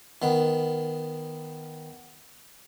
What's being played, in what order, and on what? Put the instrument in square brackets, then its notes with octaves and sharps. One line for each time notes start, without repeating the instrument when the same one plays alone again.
[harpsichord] D#3 B3